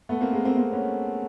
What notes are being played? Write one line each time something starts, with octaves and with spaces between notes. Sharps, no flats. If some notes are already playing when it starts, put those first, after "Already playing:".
A3 B3
A#3 C4
G#3 A#3
A#3 C4
A#3 C4
B3 C#4